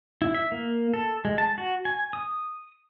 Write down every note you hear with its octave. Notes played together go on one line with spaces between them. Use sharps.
E4
E5
A#3
A4
G#3
A5
F#4
G#5
D#6